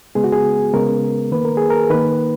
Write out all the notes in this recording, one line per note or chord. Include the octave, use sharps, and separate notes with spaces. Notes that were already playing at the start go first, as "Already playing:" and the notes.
C#3 G#3 B3 G#4
F#4
G#4
C#3 G#3 B3 A#4
D#3 A#3 B4
A#4
G#4
A#4
D#3 A#3 B4